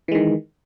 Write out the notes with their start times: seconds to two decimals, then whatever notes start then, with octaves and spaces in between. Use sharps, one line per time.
0.08 E3
0.12 G#3
0.15 D#3